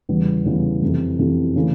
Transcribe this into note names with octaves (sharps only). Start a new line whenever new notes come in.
E2 C#3 E3 G3 B3
E2 C#3 E3 G3 B3
F2 C3 E3
F2 C3 E3
C#3 E3 A3